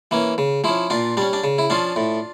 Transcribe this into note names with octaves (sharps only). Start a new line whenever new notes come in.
E3 A#3 C#4
C#3
F3 C#4 E4
A#2 D4 F4
G3 C#4 D4
D4
C#3
E4
F3 C#4 D4 F4
A2